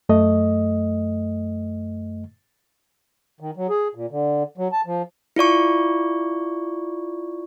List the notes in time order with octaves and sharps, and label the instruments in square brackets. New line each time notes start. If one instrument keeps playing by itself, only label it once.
[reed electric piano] F#2 A3 D#5
[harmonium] D#3
F#3
G#4
A#2
D3
F#3
A5
F3
[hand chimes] E4 F4 D5 C#6